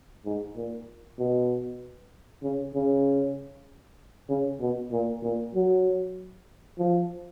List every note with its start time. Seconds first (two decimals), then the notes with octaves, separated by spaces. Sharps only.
0.25 G#2
0.56 A#2
1.19 B2
2.43 C#3
2.74 C#3
4.29 C#3
4.61 B2
4.92 A#2
5.23 A#2
5.55 F#3
6.78 F3